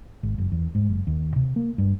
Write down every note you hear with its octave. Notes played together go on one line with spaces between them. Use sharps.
G#1
F#1
E2
G#2
F#1
D#2
C3
A#3
G2